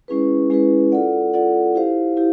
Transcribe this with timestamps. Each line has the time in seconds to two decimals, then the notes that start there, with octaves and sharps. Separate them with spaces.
0.08 G#3 C#4 E4 G#4 B4
0.50 G#3 C#4 E4 G#4 B4
0.92 F4 A4 D5 F#5
1.34 F4 A4 D5 F#5
1.75 E4 G4 C5 F5
2.17 E4 G4